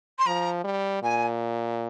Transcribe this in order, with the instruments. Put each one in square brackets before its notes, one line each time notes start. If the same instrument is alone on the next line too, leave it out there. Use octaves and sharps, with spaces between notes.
[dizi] C6
[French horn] F3 [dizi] A#5
[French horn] G3
[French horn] A#2 [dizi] G#5